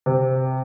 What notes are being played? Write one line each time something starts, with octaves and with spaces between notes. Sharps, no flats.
C3